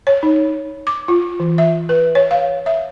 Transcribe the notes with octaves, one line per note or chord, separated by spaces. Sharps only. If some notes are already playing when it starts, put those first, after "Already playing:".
C#5
D#4
D6
F4
E3
E5
B4
C#5
F5
E5